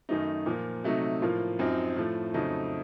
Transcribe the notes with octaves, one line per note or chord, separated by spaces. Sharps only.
F#2 D#3 F#3 A3 D#4
A#2 F3 A#3
C3 F#3 A3 D#4
A2 F3 A#3 F4
F#2 F3 C4 D#4
A2 F3 A3
F2 C#3 F#3 A3 D#4